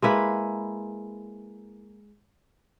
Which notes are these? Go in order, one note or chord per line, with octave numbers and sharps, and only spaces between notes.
G#3 A#3 E4 B4